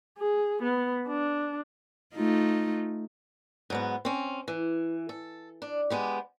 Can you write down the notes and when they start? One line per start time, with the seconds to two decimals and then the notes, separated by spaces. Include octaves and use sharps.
0.18 G#4
0.62 B3
1.08 D4
2.15 A3 D#4 F4
3.70 G#2 F#3 B3
4.05 C4 C#4
4.48 E3
5.09 A4
5.62 D4
5.90 G#3 B3 G4